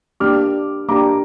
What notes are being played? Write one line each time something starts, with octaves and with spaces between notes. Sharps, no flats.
A#3 D4 G4 D6 F6
A#3 D4 G4 A#5 D6